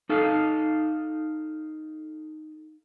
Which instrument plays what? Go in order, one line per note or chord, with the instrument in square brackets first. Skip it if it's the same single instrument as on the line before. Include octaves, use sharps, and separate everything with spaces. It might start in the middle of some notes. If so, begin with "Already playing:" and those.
[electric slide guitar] D#4 A4 F5